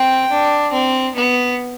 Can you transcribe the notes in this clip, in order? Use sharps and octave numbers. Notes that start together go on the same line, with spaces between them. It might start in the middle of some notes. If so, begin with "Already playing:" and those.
Already playing: C4 G5
D4
C4
B3